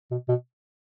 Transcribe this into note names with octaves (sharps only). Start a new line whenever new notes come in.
B2
B2